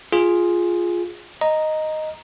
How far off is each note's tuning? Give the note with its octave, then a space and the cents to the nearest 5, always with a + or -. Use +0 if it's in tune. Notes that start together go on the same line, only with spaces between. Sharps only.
F4 +0 G#4 +0
D#5 +0 A#5 +0